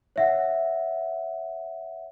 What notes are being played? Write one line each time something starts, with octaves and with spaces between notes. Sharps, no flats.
C#5 E5 F#5